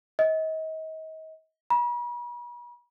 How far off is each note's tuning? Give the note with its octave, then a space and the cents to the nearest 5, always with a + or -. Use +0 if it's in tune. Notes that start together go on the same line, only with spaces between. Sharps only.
D#5 +35
B5 -45